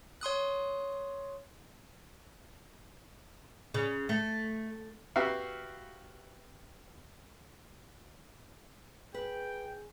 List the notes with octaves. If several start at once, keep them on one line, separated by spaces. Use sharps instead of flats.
C#5 C6 D#6 F#6
C#3
A3
B3 F#4 G4 E5 F5
G#4 B4 G5